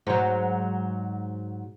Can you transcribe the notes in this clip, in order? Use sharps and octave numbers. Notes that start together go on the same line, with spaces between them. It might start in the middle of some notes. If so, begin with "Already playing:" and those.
G#2 F#3